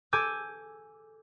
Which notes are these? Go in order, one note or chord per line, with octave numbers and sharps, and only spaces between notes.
A4 G#5 D6 E6 G6 G#6